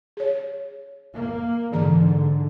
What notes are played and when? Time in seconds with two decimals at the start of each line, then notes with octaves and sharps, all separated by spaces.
0.17 G#4 C#5
1.15 A#3
1.72 G#2 D3 E3 G#4 A#5